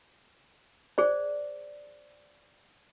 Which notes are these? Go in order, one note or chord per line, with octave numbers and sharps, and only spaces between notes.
G#4 C5 D5